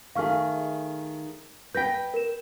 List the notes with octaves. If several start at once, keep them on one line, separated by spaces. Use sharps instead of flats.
D#3 A3 G#4 F5 C#6 F6
B4 G5 G6 A#6 B6
A#4 E7